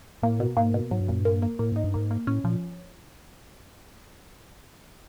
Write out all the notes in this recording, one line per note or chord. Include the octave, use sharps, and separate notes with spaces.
A2 A#3
B2
G#2 A#3
B2
G#2 F#3
G2
F#2 A#2
G2
A#3
A#3
A2 A#3
G#2 D#4
G2
G#2 A#3
A#3
A2 C#4
A#2 F3